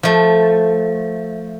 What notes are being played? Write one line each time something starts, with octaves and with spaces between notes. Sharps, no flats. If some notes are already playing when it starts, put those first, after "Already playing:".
F3 A3